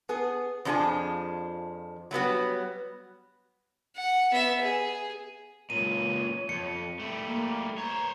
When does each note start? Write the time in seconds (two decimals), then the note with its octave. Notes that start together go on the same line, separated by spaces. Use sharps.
0.09 B3 G#4
0.65 F2 F3 D4 F#4 G#4 G#5
2.11 F#3 G3 B3 F#4
3.96 F#5
4.32 B3 E5
4.62 G#4
5.70 C#2 A#2 C#5 D#7
6.49 F2 C#7
7.00 G3 A3
7.25 A#3
7.78 C5 C#5 A#5